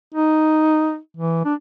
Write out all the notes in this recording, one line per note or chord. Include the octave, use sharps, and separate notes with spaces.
D#4
E3
D4